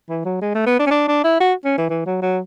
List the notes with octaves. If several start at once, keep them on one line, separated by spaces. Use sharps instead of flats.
E3
F#3
G#3
A3
B3
D4
C#4
D4
D4
E4
F#4
C#4
E3
E3
F#3
F#3